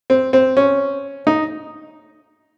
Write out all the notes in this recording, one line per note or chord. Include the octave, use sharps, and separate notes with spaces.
C4
C4
C#4
D#4